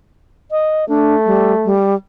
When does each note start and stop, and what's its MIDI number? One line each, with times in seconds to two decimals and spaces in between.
0.51 0.85 75
0.89 1.75 57
0.89 1.15 62
1.26 1.53 55
1.65 1.95 55